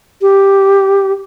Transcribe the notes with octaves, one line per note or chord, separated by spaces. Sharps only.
G4